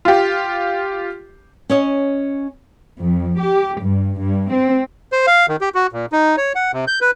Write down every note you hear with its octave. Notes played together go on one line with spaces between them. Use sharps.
F4 G4
C#4 C#5 D#5
F2
G4
G2
G2
C4
C5
F5
D#3
G4
F#4
A#2
D#4
C#5
F#5
C3
G6
B4